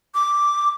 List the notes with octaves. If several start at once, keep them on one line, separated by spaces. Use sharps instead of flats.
D6